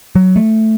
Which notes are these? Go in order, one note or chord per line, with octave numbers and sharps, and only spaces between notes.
F#3
A3